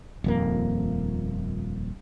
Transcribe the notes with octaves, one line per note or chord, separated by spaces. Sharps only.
D#1 F2 A#3